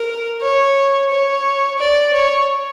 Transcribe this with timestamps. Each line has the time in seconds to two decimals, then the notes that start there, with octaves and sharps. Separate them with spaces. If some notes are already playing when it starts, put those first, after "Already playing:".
Already playing: A#4
0.42 C#5
1.11 C#5
1.79 D5
2.13 C#5